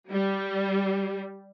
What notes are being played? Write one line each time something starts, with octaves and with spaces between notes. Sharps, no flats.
G3